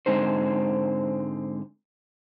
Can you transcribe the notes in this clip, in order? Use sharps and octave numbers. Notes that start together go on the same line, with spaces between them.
G#2 D3 G#3 C4 D#4 C5